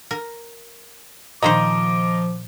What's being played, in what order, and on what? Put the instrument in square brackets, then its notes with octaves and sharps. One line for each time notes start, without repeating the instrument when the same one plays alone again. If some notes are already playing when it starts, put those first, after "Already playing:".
[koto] A#4
[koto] A#2 D#3 C5 [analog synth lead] F3 [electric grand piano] D#5 A#5 [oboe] D6